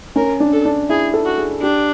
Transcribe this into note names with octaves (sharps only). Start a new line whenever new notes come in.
C#4 A#4
D4
A4
D4
E4 G#4
A4
F#4
G#4
D4 G4